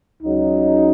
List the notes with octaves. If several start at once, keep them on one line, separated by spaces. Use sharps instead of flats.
C#2 C#3 F#3 D#4